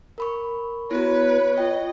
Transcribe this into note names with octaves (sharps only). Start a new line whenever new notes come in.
A#4 B5 C#6
B3 E4 F#4 B4 C#5
F4 D#5 G5